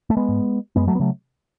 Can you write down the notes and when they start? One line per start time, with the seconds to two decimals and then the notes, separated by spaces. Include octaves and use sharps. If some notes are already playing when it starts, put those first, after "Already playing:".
0.10 A3
0.17 G#3 B3
0.29 G#2
0.76 F#2 G#3 B3
0.87 F#3 A3
0.95 B3
0.99 C#3 F#3 A3